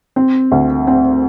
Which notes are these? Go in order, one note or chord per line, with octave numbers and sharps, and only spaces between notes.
C4
D2
C4